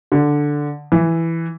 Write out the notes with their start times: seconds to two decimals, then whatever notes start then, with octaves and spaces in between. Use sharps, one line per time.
0.12 D3
0.92 E3